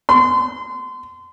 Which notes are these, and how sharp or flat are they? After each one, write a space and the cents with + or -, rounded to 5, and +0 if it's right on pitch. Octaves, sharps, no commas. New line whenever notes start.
C6 -30